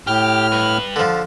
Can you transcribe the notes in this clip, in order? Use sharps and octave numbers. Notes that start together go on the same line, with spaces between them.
A2 G4 F6
G2 B4
D3 F3